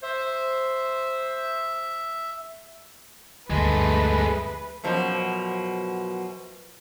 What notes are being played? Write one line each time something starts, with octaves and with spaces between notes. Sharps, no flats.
C5 E5
D2 G2 G#3 A3 B4
F#2 B2 F3